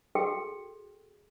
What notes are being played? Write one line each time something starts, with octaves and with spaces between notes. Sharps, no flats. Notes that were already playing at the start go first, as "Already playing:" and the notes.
F#4 G#4 A4 G5